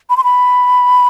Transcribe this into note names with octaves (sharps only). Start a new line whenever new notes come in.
B5
C6
B5